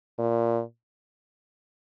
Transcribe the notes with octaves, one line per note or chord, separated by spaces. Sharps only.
A#2